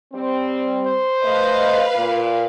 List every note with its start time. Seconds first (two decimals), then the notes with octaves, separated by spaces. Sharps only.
0.13 G3 C4
0.87 C5
1.23 A3 B4 D#5 F5
1.96 A#2